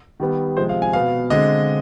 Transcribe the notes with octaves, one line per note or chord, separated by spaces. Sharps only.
D#3 G3 B3
C3 F3 G#3 C4 C5
F5
G#5
B2 B3 F5
D3 G#3 C4 D#5